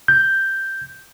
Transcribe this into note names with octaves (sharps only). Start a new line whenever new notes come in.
G6